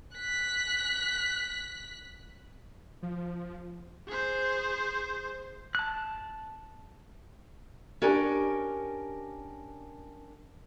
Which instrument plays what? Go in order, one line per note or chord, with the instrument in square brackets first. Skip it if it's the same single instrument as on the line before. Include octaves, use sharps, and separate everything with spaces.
[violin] F#6 B6
[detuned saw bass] F3
[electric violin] G#4 C5
[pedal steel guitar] A5 F#6
[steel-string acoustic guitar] C#4 D4 G4 A#4